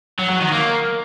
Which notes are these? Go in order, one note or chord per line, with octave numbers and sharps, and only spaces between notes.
F#3
F#3
D#3
A#3